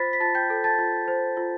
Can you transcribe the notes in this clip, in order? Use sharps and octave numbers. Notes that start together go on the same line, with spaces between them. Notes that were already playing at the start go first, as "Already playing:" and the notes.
Already playing: F4 C5 B5 A6 B6
B6
F4 A5 A6
G5 G6
A4
A5 A6
F4
C5
F4